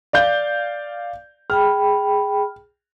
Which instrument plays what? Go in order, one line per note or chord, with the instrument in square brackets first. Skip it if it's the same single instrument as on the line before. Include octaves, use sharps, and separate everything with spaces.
[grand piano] D5 F5 G6
[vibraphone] G#4 G5 B5 [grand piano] F6